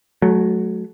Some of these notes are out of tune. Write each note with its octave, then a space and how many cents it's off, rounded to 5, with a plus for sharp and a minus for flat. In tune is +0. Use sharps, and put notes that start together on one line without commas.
F#3 +0 A3 -25